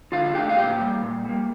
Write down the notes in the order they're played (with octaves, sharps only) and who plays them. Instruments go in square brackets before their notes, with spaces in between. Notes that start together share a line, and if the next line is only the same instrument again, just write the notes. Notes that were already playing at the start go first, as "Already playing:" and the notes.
[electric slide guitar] D3 F4 F5
F5
A3 D4 G4 G5
F5
A#2 G4 G5
G3 A#3
A#2
G3 A#3